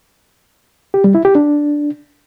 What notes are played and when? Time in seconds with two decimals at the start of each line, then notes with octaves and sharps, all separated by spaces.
0.94 G4
1.04 G3
1.15 E4
1.25 G4
1.35 D4